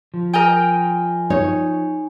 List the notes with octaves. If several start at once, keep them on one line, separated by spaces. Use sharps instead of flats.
F3
A#4 D#5 G5 G#5 G7
D#4 C#5